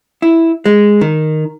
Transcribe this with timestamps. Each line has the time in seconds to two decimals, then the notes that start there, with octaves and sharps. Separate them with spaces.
0.22 E4
0.66 G#3
1.01 D#3